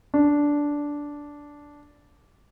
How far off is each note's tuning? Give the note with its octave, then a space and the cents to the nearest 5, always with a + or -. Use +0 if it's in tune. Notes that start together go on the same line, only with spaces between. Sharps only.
D4 -10